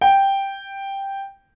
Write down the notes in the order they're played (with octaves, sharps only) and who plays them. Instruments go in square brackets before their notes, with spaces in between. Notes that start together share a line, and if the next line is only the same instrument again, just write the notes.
[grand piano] G5